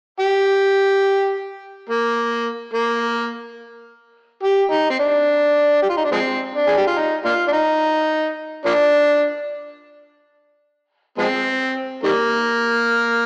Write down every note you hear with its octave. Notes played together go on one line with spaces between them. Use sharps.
G4
A#3
A#3
G4
D#4
C4
D4
G4
F4
D#4
D4
F3 G#3 C4
D4
G#4
G4
F4
D#4
A#3 D4 F4
D4
D#4
F3 A#3 D4
F3 G#3 C4
D#3 G3 A#3